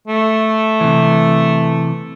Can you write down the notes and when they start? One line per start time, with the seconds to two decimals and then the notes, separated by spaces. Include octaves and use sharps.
0.08 A3
0.81 C3 E3